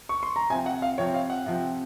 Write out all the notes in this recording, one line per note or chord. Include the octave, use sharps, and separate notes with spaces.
C#6
C6
A#5
C3 F3 C4 G#5
F#5
F5
C3 F3 C4 C#5
F5
F#5
C3 F3 C4